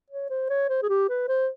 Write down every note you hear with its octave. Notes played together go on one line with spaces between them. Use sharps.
C#5
C5
C#5
C5
G#4
G4
B4
C5